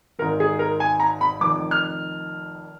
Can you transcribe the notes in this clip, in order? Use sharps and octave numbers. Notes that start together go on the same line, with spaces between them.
G#1 G#2 D#3 A#4
G#4
A#4
G#5
A#5
B5
F1 F2 D#3 D6
F6